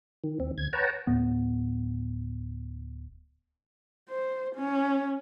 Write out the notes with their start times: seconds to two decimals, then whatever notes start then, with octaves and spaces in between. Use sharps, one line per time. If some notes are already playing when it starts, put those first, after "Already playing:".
0.24 D#3
0.40 D#2 C4
0.58 D2 G#6
0.73 B4 C#5 F#5 G5 A5 A#5
1.07 D1 A2 B3
4.09 C5
4.56 C#4